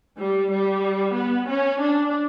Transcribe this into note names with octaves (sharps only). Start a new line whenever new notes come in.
G3
G3
B3
C#4
D4